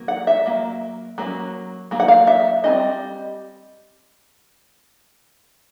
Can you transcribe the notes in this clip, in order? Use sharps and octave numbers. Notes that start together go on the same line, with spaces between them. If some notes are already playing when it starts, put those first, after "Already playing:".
Already playing: F#3 A#3
F#5
E5
F#3 A#3
F#3 A#3 C#4
F#3 A#3
F#5
F5
E5
G3 C4 D#4 D#5